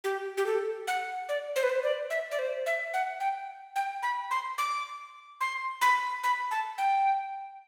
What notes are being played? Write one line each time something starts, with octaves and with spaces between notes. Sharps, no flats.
G4
G4
A4
F#5
D5
C5
B4
C5
D5
E5
D5
C5
E5
F#5
G5
G5
B5
C6
D6
C6
B5
B5
A5
G5